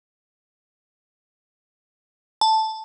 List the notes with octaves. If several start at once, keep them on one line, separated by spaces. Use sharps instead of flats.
A5